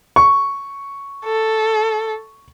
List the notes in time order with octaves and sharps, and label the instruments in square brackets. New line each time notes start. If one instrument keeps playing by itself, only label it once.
[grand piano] C#6
[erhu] A4